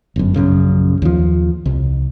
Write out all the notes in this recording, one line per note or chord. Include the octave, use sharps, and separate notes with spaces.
G1 F#2
A#1 F#2 C#3
D#2 F3
C2